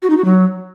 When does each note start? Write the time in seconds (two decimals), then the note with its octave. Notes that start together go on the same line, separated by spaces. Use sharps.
0.02 F#4
0.10 D#4
0.17 F#4
0.25 F#3